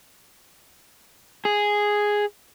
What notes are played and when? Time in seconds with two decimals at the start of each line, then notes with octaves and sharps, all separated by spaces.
1.45 G#4